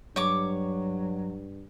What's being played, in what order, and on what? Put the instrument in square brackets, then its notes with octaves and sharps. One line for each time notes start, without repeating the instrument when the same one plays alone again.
[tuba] G2 [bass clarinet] F#3 [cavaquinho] C#5 D6